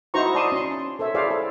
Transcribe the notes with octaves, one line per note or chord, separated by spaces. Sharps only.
D#4 E4 F#4 C5 A#5 C#6
D5 A5 C6 D#6
C#4 C6
A4 C5 C#5 E5
E4 G#4 C5 D5 F5
A4